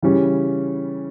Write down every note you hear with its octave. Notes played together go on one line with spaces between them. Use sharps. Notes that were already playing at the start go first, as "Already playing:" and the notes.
C#3 E3 G3 C#4